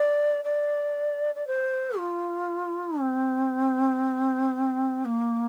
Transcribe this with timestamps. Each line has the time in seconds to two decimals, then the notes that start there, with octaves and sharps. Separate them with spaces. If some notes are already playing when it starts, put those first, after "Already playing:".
Already playing: D5
0.44 D5
1.35 D5
1.47 C5
1.97 F4
2.99 C4
5.05 A#3